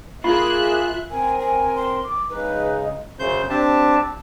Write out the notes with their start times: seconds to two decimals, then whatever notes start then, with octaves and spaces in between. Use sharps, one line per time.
0.24 A#3 F4 G#4 E5 B5 F#6
1.11 C4 A#4 G#5
1.40 G#5
1.76 C6
2.04 D6
2.30 C#3 G#3 D#4 B4
3.19 F#2 C#3 C5 G6
3.50 C4 D4 G4 A5